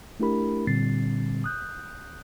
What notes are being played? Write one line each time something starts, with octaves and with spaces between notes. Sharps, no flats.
A3 D4 E4 G4 A#4 B5
A#2 D3 G3 C4 A6 C7
D#6 F#6 G6